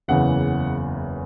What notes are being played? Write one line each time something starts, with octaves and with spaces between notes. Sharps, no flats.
F#1 E2 C#3 E3 F#5